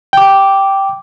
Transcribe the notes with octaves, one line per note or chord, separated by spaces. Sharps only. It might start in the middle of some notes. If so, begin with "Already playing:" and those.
G5 D6